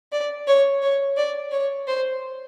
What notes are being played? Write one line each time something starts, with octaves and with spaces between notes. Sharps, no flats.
D5
C#5
C#5
D5
C#5
C5